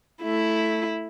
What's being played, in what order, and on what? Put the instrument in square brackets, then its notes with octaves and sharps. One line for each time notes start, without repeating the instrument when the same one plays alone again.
[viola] A3 [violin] E4